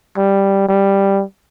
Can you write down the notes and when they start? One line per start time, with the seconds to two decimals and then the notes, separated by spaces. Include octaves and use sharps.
0.17 G3
0.68 G3